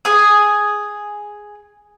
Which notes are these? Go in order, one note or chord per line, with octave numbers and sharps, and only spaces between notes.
G#4 G#5 D#6